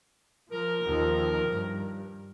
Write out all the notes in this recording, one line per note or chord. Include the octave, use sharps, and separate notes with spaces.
F3 A#4
D#2 D#3 F3
G2